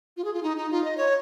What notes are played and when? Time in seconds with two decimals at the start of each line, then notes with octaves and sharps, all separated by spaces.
0.17 F4
0.25 G#4
0.34 F4
0.43 D#4
0.57 D#4
0.71 F4
0.84 D#5
0.97 C#5